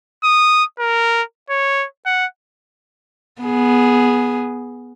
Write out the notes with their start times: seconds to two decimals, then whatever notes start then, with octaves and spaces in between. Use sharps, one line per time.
0.24 D#6
0.79 A#4
1.50 C#5
2.06 F#5
3.42 B3 G#4